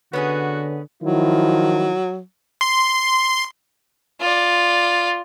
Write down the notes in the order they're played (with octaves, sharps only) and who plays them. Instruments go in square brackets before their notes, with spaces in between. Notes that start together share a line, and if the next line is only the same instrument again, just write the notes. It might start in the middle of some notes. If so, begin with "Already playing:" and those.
[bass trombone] D3 [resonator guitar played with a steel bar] B3 C#4 G#4 [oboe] F#4 [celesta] B4 C#5 F#6
[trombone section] D#3 F3 E4 [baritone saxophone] F#3
[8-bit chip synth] C6
[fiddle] F4 D5